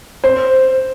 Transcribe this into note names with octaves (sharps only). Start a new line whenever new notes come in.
C5